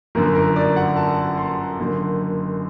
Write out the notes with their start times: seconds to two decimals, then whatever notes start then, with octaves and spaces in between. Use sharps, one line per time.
0.15 G1 F#2 D3 A#4
0.35 A#4
0.56 D5
0.76 F#5
0.96 A5
1.37 C6
1.79 F#1 F#2 D3